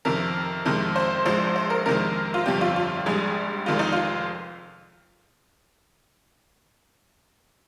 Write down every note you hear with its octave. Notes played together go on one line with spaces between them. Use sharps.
F2 C3 D#3 A#4
F2 C3 D#3 G#3
C5
A#1 G#2 F3 G#3 C5
C5
A#4
F2 C3 D#3 G#3 A#4
F4
G1 F2 C3 G3 G4
F4
F4
A#1 G#2 G3 G#4
F1 F2 D#3 G#3 F4
D#4
F4